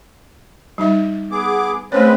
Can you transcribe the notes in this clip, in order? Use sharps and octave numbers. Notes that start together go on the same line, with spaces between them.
G3 D#4 E5
B3 G#4 D6
G#3 A3 C4 C#4 B4 C#5